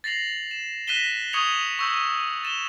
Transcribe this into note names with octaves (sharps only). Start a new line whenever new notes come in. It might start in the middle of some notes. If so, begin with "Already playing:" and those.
A6 A#6 C7 F7 F#7
E7
F#6 A#6 B6 D#7 E7 G7
C#6 D#6 G#6 C#7 F7 F#7
C#6 E6 G6
A6 E7 F7 G7